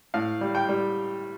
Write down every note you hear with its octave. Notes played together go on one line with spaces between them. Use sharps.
A2 F5
G3
G5
G3